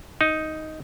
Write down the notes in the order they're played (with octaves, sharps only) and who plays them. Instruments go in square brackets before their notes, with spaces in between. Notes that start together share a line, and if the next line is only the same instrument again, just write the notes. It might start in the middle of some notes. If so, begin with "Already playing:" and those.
[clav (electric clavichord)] D#4